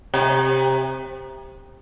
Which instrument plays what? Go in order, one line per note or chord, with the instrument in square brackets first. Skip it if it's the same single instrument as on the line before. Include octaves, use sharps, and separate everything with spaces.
[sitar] C3